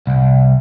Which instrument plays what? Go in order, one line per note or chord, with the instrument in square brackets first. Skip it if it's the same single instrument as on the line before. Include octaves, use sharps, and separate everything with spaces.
[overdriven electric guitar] C2